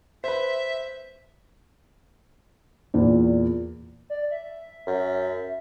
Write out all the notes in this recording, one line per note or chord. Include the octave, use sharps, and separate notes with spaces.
B4 C5 E5
E2 A#2
D5
E5
F#2